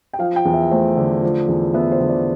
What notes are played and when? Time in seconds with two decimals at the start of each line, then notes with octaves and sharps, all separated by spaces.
0.13 G5
0.19 F3 F5
0.36 G5
0.45 E2
0.54 E5
0.71 A3 C5
0.97 D3
1.23 F3
1.48 E2
1.74 B3 E5
1.92 C5
2.01 D3
2.09 D5